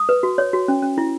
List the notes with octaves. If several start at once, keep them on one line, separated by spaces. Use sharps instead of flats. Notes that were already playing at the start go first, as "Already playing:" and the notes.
Already playing: D#6
B4
F#4
C#5
F#4
C#4
C#4
E4